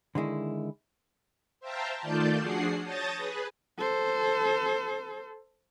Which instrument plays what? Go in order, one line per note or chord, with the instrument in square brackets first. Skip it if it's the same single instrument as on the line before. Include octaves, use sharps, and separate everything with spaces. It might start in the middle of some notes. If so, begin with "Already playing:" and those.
[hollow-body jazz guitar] D3 D#3 G#3 E4
[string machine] C5 E5 F5 G5 A5 A#5
D#3 A3 F4 D5 A5 G6
F3 D4 F#4 G#4 F#5 C7
C#5 A5 D#6 G6 A6 A#6
G#4 B4
[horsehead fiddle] A4 C5